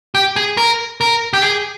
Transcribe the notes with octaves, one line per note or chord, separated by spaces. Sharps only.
G4
G#4
A#4
A#4
G4
G#4